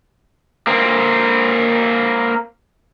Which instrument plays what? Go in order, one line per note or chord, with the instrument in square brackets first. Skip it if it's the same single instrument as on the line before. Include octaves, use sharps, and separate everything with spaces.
[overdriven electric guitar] A#3 C4